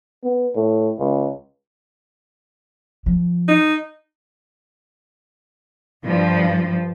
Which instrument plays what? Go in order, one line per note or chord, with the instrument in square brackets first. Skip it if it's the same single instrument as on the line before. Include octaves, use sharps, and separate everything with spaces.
[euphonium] B3
A2
C#2
[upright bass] F3
[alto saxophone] D#4
[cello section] G2 F3